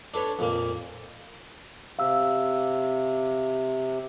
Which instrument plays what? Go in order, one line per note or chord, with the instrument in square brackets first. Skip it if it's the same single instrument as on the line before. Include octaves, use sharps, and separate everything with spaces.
[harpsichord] D4 A4 B4 C#5
F2 A#2 A#3
[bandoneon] C3 [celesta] F5 E6